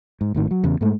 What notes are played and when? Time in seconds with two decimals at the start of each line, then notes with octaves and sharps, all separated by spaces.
0.21 G#2
0.34 G#1 A2 D#3
0.51 F#3
0.64 E2 C#3
0.81 G#2 G#3 A3